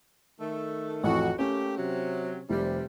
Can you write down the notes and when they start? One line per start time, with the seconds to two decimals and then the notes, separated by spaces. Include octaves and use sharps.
0.40 D#3 A3
1.03 A1 F2 F#4
1.39 A3 A#3 C#4 G4
1.78 C3 F#3
2.50 F1 C3 G3